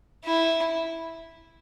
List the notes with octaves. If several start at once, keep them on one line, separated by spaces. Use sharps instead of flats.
E4